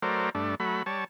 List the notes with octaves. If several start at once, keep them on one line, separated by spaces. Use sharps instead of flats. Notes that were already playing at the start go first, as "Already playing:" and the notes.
F#3 A3 A#4 C5 D5
G2 A3 D4
F#3 A3 B5
G3 C#5 A5